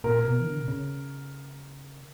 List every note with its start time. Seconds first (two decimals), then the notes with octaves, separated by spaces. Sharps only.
0.04 A#2 A#4
0.25 B2
0.40 E3
0.47 D3
0.60 B2
0.68 C#3